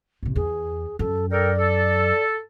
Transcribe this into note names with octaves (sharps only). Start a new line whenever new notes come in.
A1 C3
E2 G#4
F#2 A4
A4 A#4 D5 G5
A4